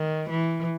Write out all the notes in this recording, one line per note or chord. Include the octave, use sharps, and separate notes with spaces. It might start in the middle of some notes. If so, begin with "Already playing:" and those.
Already playing: D#3
E3